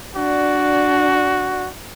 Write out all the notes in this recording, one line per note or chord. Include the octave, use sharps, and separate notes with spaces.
D4 F#4 D5